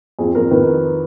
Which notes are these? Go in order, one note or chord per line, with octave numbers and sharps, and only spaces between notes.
F2 G#4
F2 A#4
D#3 B4